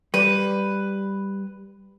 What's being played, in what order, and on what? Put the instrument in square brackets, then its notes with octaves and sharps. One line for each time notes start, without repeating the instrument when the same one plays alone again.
[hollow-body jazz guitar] G3 [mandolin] B4